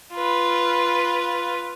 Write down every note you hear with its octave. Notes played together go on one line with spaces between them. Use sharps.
F4 B4